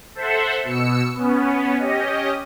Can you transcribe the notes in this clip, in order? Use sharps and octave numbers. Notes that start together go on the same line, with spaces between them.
A4 C5 E5 F#5
B2 E6 C#7
B3 C#4
C#4 G4 D#5